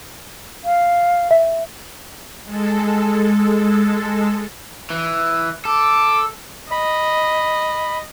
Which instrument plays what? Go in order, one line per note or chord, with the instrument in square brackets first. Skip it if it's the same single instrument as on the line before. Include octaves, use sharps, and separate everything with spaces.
[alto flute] F5
[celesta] E5
[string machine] G#3 A4
[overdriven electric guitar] E3
[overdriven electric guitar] A4 [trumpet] D6
[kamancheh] D#5 [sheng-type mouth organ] B5